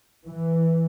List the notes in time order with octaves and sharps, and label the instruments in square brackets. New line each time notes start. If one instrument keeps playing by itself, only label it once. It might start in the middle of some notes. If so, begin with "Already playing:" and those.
[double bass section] E3